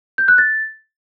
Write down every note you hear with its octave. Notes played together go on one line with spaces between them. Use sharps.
G6
F#6
A6